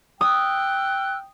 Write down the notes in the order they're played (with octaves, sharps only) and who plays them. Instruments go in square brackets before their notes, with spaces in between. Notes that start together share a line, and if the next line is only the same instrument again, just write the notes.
[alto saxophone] G5 [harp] D#6 [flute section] E6 F#6